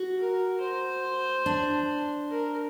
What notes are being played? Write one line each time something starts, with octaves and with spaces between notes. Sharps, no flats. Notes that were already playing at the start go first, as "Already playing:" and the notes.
Already playing: F#4
A#4
C5
D4
A#4